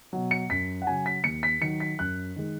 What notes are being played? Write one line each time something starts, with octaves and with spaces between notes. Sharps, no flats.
B2 F#3
C#7
F#2 B6
F#5
C#3 F#3 G#5
B6
D#2 C#7
B6
D#3 F#3 C#7
B6
F#2 F#6
D#3 G#3